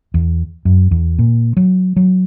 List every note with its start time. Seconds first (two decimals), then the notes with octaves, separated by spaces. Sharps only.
0.14 E2
0.65 F#2
0.91 E2
1.19 A#2
1.57 F#3
1.96 F#3